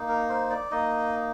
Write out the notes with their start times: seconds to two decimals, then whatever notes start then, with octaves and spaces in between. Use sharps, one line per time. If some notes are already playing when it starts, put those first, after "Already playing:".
Already playing: A#3 D#4
0.09 A#4
0.29 C5
0.50 D5
0.71 A#3 D#4 D#5